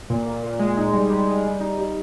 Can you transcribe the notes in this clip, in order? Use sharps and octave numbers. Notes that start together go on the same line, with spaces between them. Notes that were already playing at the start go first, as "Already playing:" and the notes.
A#2
A#2
A#2
G#3
D#4
G3
G3
D#4
G3
D#4
G3